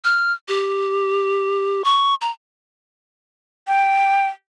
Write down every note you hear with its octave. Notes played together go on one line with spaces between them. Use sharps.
F6
G4
C#6
A#5
G5